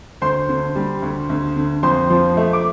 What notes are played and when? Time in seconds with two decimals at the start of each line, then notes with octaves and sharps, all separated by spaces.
0.22 D2 C5 C6
0.49 D3
0.75 G3
1.02 D2
1.29 D2
1.56 D3
1.83 F2 C5 C6
2.10 F3
2.37 A3
2.53 D6